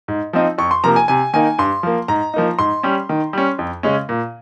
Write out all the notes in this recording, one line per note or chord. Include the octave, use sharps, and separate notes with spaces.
G#2
F3 C4 D#4
F2 C#6
C6
C3 F3 A#3 A#5
G#5
C3 G#5
D#3 A#3 D#4 G#5
G2 C6
F3 A#3
G#2 A#5
F3 A#3 D#4
G#2 C6
G3 C#4
D#3
G3 C#4
F2
C#3 G#3 C#4
A#2